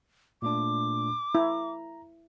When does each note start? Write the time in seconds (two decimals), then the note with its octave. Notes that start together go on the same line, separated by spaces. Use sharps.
0.42 A#2 A3 D4 D6
1.35 E4 A#5